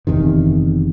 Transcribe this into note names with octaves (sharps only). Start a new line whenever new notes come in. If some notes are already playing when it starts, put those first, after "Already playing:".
F#1 E2 C3 D#3